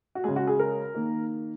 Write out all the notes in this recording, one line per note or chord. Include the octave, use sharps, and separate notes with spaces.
F#4
C#3 G#3 G#4
F#4
G#4
A#4
D#3 A#3